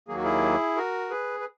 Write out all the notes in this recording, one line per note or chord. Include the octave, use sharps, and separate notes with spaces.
D#2 D#3 F#3 A#3 G#4
F#4
E4 G#4
F#4 A#4
G#4 B4
B4